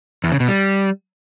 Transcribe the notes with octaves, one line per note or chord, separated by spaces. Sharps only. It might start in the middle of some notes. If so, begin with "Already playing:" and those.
E2
C#3
B2
G3